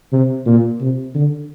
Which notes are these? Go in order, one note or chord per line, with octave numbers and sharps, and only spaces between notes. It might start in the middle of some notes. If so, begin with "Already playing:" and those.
C3
A#2
C3
D3